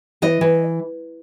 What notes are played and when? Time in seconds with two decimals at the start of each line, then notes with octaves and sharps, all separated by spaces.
0.22 E3 D#5
0.41 E3